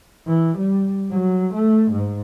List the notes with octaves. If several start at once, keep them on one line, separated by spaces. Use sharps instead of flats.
E3
G3
F#3
A3
G#2